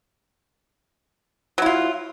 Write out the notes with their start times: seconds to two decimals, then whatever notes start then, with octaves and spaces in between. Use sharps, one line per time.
1.58 F#3
1.62 E4
1.66 F4